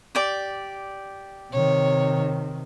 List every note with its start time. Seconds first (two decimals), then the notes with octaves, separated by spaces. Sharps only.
0.15 G4 D5 D6
1.52 C3 D#3 C#5